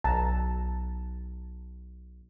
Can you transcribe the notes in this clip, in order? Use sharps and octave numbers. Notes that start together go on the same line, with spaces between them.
B1 A5 A#5